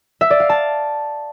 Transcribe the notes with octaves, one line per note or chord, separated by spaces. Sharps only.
E5
D5
F5
A5